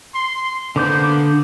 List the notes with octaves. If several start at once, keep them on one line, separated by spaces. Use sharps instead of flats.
C6
D3 A#3 B3 C5 D6 G6